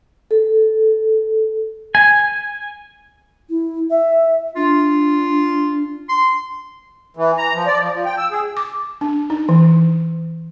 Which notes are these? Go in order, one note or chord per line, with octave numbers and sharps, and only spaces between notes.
A4
G#5
E4
E5
D4 F4
C6
E3
A#5
F3
D5
F3
F3
G5
E6
G#4
D6
D4
D#4
E3